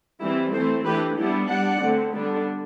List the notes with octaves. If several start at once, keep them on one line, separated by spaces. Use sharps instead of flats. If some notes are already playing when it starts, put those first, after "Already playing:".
E3 G3 C4 E4
E3 A3 C4 A4 C5
E3 A3 D4 G4 B4
G3 B3 D4 E4 G4
G3 D4 D5 F#5
D3 A3 C4
D3 G3 B3 D4